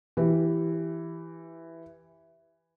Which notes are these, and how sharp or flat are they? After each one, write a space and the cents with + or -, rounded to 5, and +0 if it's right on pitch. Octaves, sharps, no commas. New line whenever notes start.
E3 +0 G4 +0